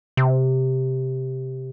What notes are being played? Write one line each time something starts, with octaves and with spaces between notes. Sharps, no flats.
C3